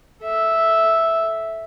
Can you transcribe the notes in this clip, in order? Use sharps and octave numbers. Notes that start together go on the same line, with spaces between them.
A4 E5